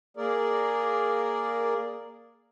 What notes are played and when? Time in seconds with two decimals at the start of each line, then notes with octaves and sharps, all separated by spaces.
0.17 A#3 G#4 A#4 D5